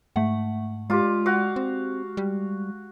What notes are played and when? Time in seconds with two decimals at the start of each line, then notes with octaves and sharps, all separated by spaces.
0.16 G#2 A3 F#5
0.90 G#3 F4 G4 D6
1.26 F#4 F5
1.56 C4
2.17 G3